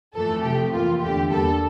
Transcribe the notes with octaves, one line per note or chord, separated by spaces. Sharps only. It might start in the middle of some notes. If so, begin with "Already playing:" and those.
F2 E3 A3 A4
C3 F3 A3 G4
F2 E3 A#3 F4
E2 D3 A3 G4
E2 D3 G3 A#3 A4